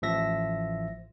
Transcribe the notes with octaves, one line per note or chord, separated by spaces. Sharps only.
A1 F3 E5 A#6